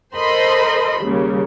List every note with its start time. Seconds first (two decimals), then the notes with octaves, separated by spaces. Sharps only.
0.16 A4 A#4 C5 D#5 B5 C6
1.02 D#2 C#3 G3 A#3